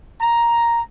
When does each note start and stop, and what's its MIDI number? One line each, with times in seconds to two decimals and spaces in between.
0.21 0.81 82